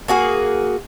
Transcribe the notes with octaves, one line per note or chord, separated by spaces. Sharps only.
A#3 F#4 G#4